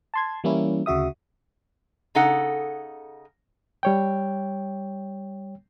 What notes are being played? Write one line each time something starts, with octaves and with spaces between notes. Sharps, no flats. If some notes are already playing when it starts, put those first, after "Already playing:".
A5 C6 G#6
E3 G3 A#3 C#4 E4
D2 C#3 F#4 E5 D#6
C#3 D#4 A4 F#5
G3 C#5 G5